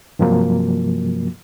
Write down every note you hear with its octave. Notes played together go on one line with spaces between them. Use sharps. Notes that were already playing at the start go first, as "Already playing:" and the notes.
G2 C3 F3 F#3 A#3